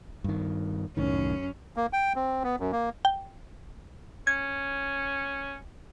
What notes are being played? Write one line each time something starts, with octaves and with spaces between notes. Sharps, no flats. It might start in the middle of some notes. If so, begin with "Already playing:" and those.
G2 D#3
C2 F#2 A2 D#3 C#4
A#3
G5
C4
B3
F#2
A#3
G5
C#4 G#6